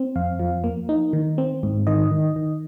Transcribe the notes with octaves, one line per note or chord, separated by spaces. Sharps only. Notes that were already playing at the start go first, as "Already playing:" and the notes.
Already playing: C4
F2 F5
F3
A#3
D#4
D#3
C4
G#2
D#3 D#5
D#3
D#3